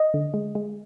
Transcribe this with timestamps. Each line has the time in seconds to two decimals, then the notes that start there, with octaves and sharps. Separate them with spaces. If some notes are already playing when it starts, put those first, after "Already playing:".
Already playing: D#5
0.14 D3
0.34 G#3
0.55 G#3